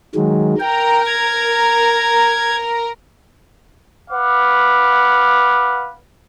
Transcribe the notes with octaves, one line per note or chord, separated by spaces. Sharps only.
D#3 F#3 G#3
A#4 G5 A#5
G#6
B4 F5 F#5 D6